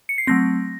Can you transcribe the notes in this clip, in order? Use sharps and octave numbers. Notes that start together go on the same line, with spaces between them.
C#7
C7
F#3 A3 C4 A#6